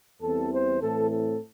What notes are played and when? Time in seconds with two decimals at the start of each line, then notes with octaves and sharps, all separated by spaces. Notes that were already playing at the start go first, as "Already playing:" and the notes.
0.21 E2 E3 G3 C4 A4
0.51 C5
0.81 A2 E3 C4 A4
1.10 A4